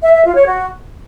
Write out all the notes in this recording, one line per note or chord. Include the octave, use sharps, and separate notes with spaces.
E5
E5
F4
C#5
F#4